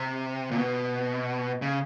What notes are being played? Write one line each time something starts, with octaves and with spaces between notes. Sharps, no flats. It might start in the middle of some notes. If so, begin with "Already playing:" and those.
Already playing: C3
A#2
B2
C#3